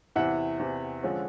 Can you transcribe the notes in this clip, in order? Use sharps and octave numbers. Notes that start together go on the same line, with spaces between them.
E2 C3 E3 E5 F#5
E2 C3 E3
D3 F3 G#3 C#4